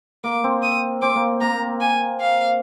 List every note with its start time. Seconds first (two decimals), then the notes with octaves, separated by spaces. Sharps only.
0.24 A#3 D6
0.44 C4
0.63 D#6
1.02 C4 D6
1.16 A#3
1.41 A#3 A#5
1.81 G#5
2.20 F5